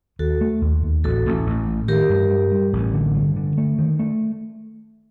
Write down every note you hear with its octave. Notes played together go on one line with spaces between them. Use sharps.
D#2 F#4 A4
A3
D#2
D#2
A1 F#4 A4
A1
A1
A2
D#3 G4 A#4
G2
G3
G3
A1
D3
G2
D3
A3
D#3
A3